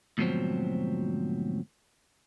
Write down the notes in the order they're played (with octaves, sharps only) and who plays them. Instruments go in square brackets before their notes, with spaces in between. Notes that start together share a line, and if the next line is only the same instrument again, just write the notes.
[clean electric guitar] D2 G#2 B2 F3 F#3 C4